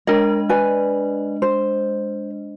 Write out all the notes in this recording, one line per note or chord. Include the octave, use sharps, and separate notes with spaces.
G#3 D4 A#4 D#5
B4 D5 G#5
C5